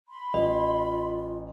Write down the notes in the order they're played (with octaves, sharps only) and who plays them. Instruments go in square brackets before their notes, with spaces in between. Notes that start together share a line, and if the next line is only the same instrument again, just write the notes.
[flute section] B5 C6
[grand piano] A1 [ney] F4 [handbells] D#5